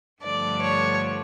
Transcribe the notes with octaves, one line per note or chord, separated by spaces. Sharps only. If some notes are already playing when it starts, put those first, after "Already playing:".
G2 D3 F3 A3 D4 D5
C#5